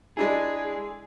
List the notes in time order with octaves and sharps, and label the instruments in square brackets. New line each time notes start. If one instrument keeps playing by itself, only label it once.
[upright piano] G#3 D4 E4 [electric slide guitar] G#4